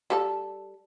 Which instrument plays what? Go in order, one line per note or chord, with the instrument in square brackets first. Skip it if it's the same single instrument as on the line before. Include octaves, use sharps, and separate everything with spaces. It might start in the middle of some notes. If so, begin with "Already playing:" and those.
[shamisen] G3 A4 A5